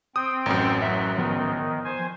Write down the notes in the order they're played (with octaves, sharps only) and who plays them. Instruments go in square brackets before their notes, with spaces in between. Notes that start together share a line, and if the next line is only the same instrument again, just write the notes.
[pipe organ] C4 G5 [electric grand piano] D#6
[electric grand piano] A1 F#2
[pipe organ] F#3 [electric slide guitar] E5
[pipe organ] D#3 [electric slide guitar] F3 B3 B4
[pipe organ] C5 G#5